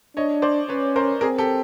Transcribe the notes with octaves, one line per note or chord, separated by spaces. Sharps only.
D4 C#5 D#5
C5 D5
C#4 B4 C#5
A#4 C5
C4 G#4 A#4
G4 A4